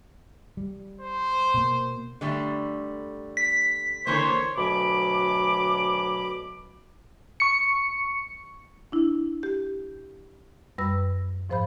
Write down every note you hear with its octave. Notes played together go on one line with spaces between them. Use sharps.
G3
C5
B2 A#3
D3 G3 A3
B6
D3 E3 A#3 C5 C#5
D2 B2 F#3 B5 D6
C#6 C#7
D4 E4
G4 G6
F#2 G3 B4 B5 E6 A#6
G#2 F3 C5 F5 B5 G6